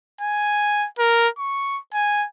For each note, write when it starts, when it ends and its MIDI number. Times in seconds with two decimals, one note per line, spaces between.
0.21 0.87 80
0.99 1.28 70
1.38 1.79 85
1.94 2.26 80